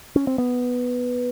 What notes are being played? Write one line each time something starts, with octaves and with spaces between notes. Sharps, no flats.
C#4
C4
B3